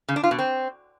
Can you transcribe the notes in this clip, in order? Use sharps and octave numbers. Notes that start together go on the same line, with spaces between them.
C#3
D4
F4
B2
C4